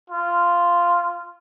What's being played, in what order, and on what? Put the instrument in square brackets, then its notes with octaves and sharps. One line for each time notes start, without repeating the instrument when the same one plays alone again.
[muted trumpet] F4